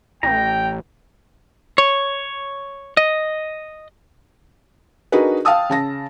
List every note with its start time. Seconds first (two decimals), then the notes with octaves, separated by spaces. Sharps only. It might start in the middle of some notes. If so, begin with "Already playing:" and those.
0.23 A1 G5 A#5
1.78 C#5
2.97 D#5
5.12 D4 D#4 F#4 G#4 A#4 B4
5.45 F5 G5 A5 D#6 E6
5.70 C#3 A5 A#6